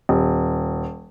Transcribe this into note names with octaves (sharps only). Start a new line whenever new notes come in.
D#1